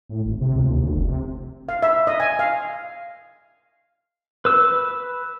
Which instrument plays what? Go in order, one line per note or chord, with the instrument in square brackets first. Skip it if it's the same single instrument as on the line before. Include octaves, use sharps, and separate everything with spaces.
[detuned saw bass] A2
G#1
C3
C#2
D#2
D2
F1
C3
[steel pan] F5
E5
D#5
G#5
F5
[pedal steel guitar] B4 E6